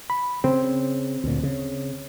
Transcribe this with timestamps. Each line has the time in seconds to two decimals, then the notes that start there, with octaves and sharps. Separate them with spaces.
0.10 B5
0.44 C#3 C4
1.24 D2 A#2
1.43 C#3